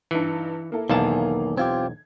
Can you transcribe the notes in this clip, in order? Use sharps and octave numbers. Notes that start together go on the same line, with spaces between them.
G2 E3 D#4 C#7
A#3 E4 A4
B1 E2 D#3 A#3 F5 G#5 A5
C4 F4 G4 G#6